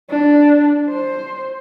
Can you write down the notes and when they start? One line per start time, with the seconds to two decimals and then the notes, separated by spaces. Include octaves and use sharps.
0.10 D4
0.90 C5